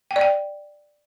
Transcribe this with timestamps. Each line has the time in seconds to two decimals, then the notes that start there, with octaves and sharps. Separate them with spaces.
0.11 G5
0.16 D5
0.21 G5